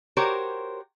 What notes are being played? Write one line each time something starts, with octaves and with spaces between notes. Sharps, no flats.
F#4 G4 A#4 C5 C#5